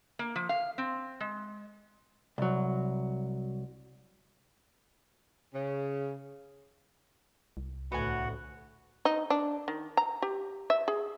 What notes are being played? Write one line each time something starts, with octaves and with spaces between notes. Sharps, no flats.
A#3
F3
F5
C4
G#3
C2 F#3
C#3
C2
D2 A2 B3 F#4 F#5 G#5
D#4
D4
D#3
A#5
G4
E5
G#4